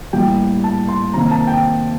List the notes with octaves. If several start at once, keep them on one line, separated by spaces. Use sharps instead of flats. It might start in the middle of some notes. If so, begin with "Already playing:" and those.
A2 G3 A#3 G5
A5
C6
C3 D#3 A#3 A#5
A5
G5